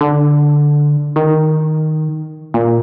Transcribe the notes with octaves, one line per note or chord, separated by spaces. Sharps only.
D3
D#3
A#2